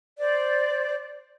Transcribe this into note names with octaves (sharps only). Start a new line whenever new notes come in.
C5 D5